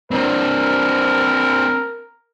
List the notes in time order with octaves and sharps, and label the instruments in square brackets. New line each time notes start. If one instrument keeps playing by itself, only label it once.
[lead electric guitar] C4 D4 [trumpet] A#4